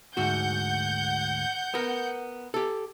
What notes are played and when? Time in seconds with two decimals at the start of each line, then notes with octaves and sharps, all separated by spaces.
0.17 D2 G#2 F#4 F#5 G6
1.74 B3 A#4
2.54 G4 A4